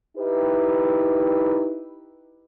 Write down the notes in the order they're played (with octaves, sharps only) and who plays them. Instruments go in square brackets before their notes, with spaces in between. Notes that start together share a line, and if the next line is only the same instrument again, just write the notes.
[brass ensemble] D#4 E4 G4 B4